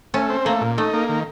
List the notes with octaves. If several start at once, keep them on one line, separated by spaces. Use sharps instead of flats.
A3 C#4
C4
A3 A#3
A#2
A3 D#4
A#3
D#3